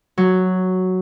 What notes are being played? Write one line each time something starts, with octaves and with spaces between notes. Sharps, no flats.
F#3